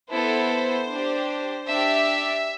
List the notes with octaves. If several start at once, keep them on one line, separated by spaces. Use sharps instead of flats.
B3 E4 A4 C5
D4 G4
D4 G4 E5